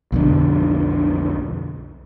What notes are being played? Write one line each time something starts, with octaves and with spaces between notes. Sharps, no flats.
B1 F2 D3